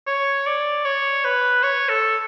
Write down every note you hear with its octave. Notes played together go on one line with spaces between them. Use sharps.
C#5
D5
C#5
B4
C#5
A4